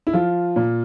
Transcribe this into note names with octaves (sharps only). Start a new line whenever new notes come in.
E4
F3 F4
A#2